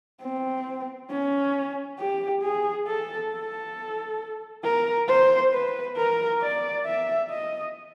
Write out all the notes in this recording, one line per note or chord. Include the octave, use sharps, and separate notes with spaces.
C4
C#4
G4
G#4
A4
A4
A#4
C5
B4
A#4
D5
E5
D#5